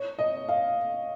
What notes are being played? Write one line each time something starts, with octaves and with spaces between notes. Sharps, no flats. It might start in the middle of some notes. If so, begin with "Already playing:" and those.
Already playing: C#5
D#5
F5